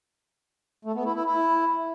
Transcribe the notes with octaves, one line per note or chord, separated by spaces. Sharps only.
A3
B3
E4
E4
E4